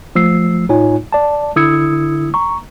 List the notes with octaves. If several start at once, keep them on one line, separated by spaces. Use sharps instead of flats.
F3 A3 E6 C7
A2 D#4 F4 C#5 G#5
D5 A5
D3 E4 D#6 E6 G#6 C#7
A#5 C#6